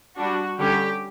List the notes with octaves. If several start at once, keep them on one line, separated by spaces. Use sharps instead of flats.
G3 D4 F#4
D3 G3 C#4 G4